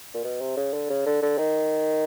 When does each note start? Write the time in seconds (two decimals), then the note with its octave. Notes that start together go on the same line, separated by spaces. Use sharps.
0.14 A#2
0.24 B2
0.41 C3
0.57 C#3
0.73 D3
0.90 C#3
1.06 D3
1.22 D3
1.38 D#3